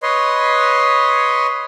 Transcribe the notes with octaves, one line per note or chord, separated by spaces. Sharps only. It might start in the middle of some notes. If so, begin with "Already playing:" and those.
B4 C#5 D#5 C6